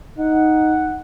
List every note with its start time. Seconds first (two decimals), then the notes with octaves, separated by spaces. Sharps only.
0.18 D#4 F#5